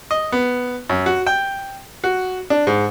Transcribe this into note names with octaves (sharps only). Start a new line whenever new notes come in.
D#5
B3
F#2
F#4
G5
F#4
D4
G#2